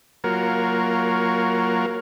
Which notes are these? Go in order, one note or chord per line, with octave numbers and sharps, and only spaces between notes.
F#3 A#3 F4 F#4 A#4 C#5